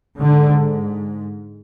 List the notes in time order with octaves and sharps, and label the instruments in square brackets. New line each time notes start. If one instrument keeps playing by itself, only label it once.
[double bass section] G#2 D3